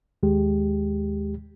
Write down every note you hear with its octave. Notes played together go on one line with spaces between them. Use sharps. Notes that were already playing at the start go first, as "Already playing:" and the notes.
D#2 G#3 G4